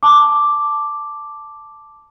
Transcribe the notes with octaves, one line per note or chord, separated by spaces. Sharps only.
A5 D6